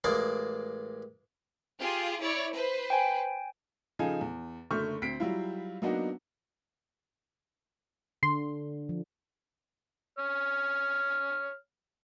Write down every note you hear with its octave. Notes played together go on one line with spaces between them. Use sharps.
A1 G#3 A#3 D5
F4 G4 G#4
E4 C#5 D5
B4 C5
G5 G#5
C#3 F3 D#4 A4 F5 G#5
E2
F#1 D3 A3 C#6 F6 G6
D2 C4 B6 C7 D7
F#3 G3 E4 F4
F#3 A#3 B3 D4 D#4 F#4
D3 C6
F3
C#5 F6